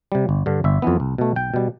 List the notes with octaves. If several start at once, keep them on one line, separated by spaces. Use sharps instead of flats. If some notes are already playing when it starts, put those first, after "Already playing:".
C3 G3
G1
G2 D3
G1 E5
F2 E3 B3
C2
B2 A3
B1 G5
B2 G3